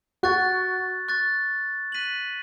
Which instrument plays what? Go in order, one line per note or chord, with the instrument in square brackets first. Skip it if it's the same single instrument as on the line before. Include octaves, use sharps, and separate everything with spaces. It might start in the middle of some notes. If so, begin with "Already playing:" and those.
[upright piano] F#4 [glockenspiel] C#6 F#6 A6
[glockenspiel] C#6 F#6 A6
F#6 B6 D#7 F#7